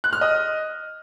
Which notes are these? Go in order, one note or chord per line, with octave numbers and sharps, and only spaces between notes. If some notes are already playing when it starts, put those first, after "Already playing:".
F#6
F6
D#5